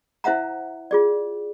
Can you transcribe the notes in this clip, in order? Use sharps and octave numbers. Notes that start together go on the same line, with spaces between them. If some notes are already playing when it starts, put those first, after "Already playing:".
E4 C5 E5 F#5 A#5
F4 G#4 D5